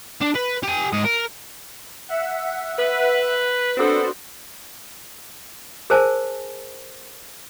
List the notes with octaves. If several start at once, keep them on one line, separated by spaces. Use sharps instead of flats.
D4
B4
G4 G#5
G#2 D#5
A#4
E5 F#5
B4
B3 C4 D4 F#4 A4 C5
G#4 A#4 C5 G#5 A5